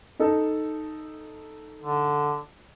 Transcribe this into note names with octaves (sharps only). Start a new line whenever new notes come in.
D#4 A4
D3